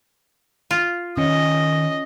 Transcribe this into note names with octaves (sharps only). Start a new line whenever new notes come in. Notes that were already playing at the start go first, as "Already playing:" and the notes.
F4
D#3 C#4 D#5